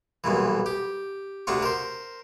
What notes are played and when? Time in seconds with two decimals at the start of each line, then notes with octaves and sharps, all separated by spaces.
0.24 B1 G2 A#2 E3
0.66 G4
1.47 D2 C3 D4 F4 C#6
1.63 A#4 C5